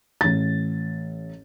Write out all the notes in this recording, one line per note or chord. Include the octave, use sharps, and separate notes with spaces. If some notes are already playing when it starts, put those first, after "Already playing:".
A1 A6